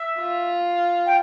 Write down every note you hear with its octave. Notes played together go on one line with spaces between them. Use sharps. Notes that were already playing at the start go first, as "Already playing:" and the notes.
Already playing: E5
F4
G5